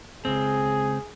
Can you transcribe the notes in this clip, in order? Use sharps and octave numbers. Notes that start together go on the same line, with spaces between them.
C#2 G2 C4 G#4